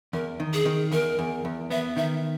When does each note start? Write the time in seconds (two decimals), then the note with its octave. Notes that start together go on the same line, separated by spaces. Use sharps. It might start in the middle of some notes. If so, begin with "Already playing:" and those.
0.13 E2 A#4
0.40 D#3
0.53 G#4
0.66 D#3
0.91 E2 A#4
1.19 E2
1.45 E2
1.70 B3 E5
1.96 D#3 E5